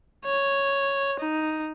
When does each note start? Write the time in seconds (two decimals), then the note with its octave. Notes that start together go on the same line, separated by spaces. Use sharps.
0.26 C#5
1.20 D#4